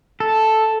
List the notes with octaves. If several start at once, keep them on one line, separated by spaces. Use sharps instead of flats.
A4